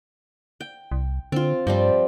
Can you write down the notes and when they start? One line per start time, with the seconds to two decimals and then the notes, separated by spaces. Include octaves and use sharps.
0.61 G5
0.92 C2
1.32 D3 C4 F4
1.67 G2 F3 G3 C4